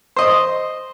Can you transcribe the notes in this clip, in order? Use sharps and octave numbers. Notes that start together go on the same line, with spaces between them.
C5 D#5